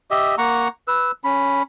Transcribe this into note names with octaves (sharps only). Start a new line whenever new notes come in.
G4 D#5 E5
A#3 F#5 A#5 C#6
B4 E6
C#4 B5